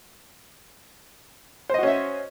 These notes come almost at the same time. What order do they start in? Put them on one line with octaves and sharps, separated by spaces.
C5 D#5 F#4 C#4 E5